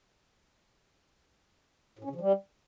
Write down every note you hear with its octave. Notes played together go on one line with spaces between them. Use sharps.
A2
C#4
C#3
F3
G3